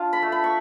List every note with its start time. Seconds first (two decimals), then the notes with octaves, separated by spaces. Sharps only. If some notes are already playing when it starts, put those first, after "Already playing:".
Already playing: D4 F4 A5
0.13 B5
0.22 A3
0.32 B5
0.44 C#6